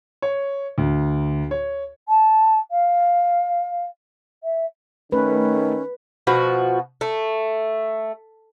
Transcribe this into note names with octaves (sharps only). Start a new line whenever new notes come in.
C#5
D2
C#5
A5
F5
E5
D#3 A3 C#4 B4
B2 F3 F#4
A3